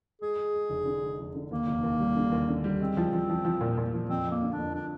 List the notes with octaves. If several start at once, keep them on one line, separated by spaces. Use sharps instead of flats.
G#3 G#4
G#3
G#3
F1
D3
G#3
F1
D3
D#2 A#3
F1
D#2
G3
D3
D#2
D3
G3
G#3 C4
F3
F3
F3
F3
A#2
A#2
F3
F2 C4
F2
A#3
D3
D4
F2
D4